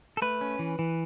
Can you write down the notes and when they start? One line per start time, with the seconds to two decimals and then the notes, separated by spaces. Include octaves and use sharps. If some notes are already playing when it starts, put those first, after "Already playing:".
0.17 A4
0.22 A3 B4
0.41 C#4
0.59 E3
0.79 E3